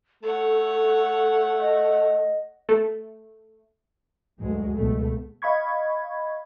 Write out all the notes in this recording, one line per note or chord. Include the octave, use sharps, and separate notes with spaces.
A3 A4 C#5 F#5
D#5
A3
D2 G2 F#3 G#3
C#2 B2 A3
D#5 F5 B5 C#6 G#6